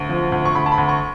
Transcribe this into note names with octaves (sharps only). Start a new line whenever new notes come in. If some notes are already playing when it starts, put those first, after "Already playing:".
Already playing: D2
F3
D2
C#6
D2 B5
A5
B5
D2
C#6